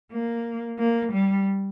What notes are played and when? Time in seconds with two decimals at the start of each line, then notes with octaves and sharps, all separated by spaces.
0.12 A#3
0.79 A#3
1.13 G3